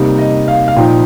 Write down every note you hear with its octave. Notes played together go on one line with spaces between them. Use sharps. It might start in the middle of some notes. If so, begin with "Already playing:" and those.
Already playing: C3 G3 A#3 D#4
D#5
F5
F5
A#2 F3 D#4 G5